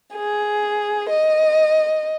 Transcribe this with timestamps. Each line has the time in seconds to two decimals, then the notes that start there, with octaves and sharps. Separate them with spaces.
0.15 G#4
1.10 D#5